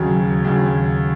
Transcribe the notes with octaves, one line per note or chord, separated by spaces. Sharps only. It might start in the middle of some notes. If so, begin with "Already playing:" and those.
Already playing: D#2 C#3 F#3
D#2 C#3 F#3